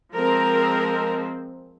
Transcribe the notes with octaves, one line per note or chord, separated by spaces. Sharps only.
F3 G#3 C4 A#4